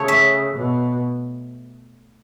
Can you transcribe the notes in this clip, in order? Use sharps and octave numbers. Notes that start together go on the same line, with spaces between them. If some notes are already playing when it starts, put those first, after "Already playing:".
Already playing: C#3 A3 A4 C#5
E5
B2